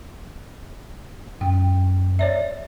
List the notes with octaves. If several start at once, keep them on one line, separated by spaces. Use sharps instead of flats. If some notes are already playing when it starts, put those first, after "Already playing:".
F#2 G5
C#5 D5 E5